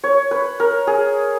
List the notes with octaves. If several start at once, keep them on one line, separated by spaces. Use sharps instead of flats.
C#5
B4
A#4
G#4